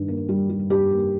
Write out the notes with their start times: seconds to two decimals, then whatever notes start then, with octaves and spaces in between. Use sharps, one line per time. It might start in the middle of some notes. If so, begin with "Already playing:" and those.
Already playing: G2 D#3
0.08 A#3
0.29 G3
0.49 G3
0.70 G2 G4
0.91 A#3